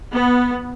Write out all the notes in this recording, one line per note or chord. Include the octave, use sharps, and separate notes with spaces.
B3